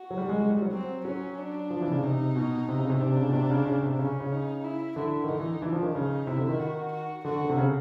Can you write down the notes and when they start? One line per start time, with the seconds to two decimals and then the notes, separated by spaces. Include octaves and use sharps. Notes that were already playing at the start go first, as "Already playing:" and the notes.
Already playing: F#4
0.11 F#3
0.18 G3
0.29 G#3
0.40 G#3
0.50 G3
0.62 F#3
0.72 C4
1.05 F#3 C#4
1.38 D4
1.70 F3
1.81 E3
1.87 C3
1.92 C#3
2.03 C3 D#4
2.36 B2
2.68 C3
2.79 C#3
2.90 C3
3.01 C3 D4
3.17 C#3
3.29 B2
3.33 C3
3.50 C#3
3.66 C#3
3.82 C3
3.99 C#3 C#4
4.20 C#3
4.32 D#4
4.64 E4
4.96 D3 E4
5.24 D#3
5.29 D3 D#4
5.40 E3
5.62 E3 D4
5.72 F3
5.83 D#3
5.95 C#3 D#4
6.27 C3 E4
6.38 D3
6.49 D#3
6.60 F#4
6.93 F#4
7.25 D3 F#4
7.41 D3
7.49 C3
7.57 C#3